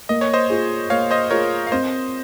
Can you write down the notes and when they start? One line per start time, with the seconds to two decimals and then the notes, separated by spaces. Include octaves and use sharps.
0.09 A#3 D#5
0.21 C#5
0.33 C5 D#5
0.50 F4 G#4
0.90 A#3 C#5 F5
1.11 C5 D#5
1.31 F4 G#4 A#4 C#5
1.67 F5
1.72 C4 C5 D#5